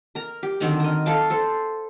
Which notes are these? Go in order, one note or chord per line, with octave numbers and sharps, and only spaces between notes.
A#4 A#5
G4
D3 D#3 F#3 C4
A#4 D#5
A4 F5 A5 D6
A4 C5